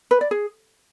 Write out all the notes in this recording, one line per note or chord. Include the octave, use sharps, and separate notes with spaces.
B4
D5
G#4